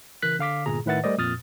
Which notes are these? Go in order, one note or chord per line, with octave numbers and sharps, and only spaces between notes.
C#3 E3 A#4 F#6 B6
D3 F5 D6 B6
G1 A#2 G#4 A#5
A2 D#3 B4 E5 F#5 A6
G3 A3 A#4 C5 D5 D#5
F2 A#2 D#6 F6 A6